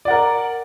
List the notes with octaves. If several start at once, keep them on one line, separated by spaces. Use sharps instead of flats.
A#4 D5 F#5